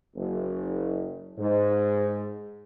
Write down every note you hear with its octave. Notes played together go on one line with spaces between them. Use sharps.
F#1
G#2